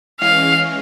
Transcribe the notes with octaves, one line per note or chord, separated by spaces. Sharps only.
E3 G#3 C#4 F5